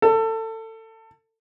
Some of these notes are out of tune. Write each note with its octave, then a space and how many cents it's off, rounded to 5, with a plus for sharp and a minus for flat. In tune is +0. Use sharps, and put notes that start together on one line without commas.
A4 +25